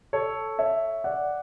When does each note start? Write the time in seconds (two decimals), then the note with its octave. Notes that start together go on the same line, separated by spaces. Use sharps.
0.13 A4 C#5
0.59 C#5 E5
1.04 D5 F#5